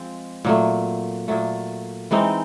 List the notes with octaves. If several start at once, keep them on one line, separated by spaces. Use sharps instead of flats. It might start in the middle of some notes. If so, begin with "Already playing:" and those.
Already playing: F3 G#3 C4
A#2 F#3 A3
A#2 F#3 A3
E3 G#3 C4 D#4